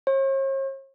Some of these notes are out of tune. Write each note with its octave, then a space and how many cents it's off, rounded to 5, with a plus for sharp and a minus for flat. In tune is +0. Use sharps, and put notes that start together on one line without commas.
C#5 -45